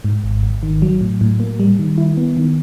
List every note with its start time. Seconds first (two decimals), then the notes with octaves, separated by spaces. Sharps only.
0.05 G#2
0.24 G#1
0.43 G#1
0.63 D#3
0.82 F#3
1.01 A2
1.21 A2
1.40 A#3
1.60 G3
1.79 D#3
1.98 E4
2.17 B3
2.37 D#3